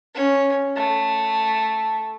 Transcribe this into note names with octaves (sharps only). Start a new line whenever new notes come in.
C#4
A3